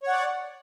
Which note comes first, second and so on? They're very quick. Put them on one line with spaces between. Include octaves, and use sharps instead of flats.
C#5 F#5 D5